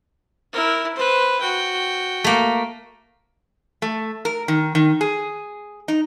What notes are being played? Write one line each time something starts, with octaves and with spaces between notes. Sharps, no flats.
E4 A#4
B4 C5
F#4 G5
A3 A#3
A3
A#4
D#3
D#3
G#4
D#4